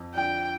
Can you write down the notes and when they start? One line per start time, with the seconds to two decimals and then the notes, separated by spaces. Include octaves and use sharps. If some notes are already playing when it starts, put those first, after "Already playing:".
Already playing: F2
0.14 D3 F3 G5